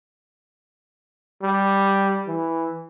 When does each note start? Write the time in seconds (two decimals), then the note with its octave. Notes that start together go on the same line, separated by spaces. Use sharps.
1.42 G3
2.27 E3